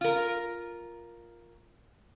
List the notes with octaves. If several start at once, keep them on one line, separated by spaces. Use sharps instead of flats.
F4 A#4